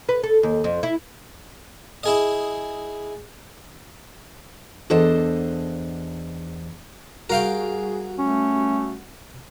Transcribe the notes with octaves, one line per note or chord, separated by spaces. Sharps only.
B4
A4
D#2
F2
E4
E4 G#4 D#5
E2 D4 A4 C5 D#5 F#5
G3 F#4 G#4 A#4 F5 G5
A3 C#4